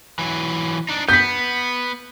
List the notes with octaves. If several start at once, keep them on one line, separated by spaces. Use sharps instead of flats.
E3 F#3
D4 D#4
B3 G6 B6